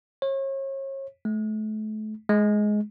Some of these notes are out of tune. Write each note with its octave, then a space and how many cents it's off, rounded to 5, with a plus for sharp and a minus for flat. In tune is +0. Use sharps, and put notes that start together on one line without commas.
C#5 -35
A3 -35
G#3 +15